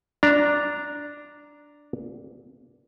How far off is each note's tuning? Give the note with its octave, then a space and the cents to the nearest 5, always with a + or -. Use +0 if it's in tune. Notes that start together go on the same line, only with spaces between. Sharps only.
D4 +0 A#5 +0